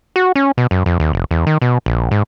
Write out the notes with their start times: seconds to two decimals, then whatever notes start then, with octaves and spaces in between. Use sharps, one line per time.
0.16 F#4
0.36 C#4
0.58 B2
0.71 F#2
0.86 F2
1.00 D#2
1.13 F1
1.31 E2
1.47 D#3
1.62 B2
1.86 A#1
2.11 G#2